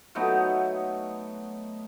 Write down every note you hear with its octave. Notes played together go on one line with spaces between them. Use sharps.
F#3 A3 B3 D#4